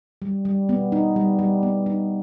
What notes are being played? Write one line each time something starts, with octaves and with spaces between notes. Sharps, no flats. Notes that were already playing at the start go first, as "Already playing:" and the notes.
G3
G3
B3
D#4
G3
G3
B3
D#4